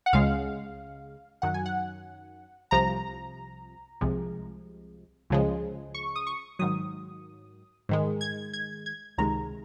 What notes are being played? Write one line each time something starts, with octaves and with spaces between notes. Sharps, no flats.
F#5
C#2 C#3 G#3 F5
F#2 D#3 F#3 F#5
G#5
F#5
C2 C3 F3 A#5
C2 C3 F3 G#3
C#2 C#3 F3 G#3
C#6
D#6
C#6
G#2 D#3 F#3 D#6
G#2 D#3 G#3
G#6
G#6
G#6
C#2 C3 D#3 G#3 A#5